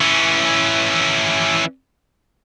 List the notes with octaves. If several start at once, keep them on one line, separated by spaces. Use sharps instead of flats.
E3 C#4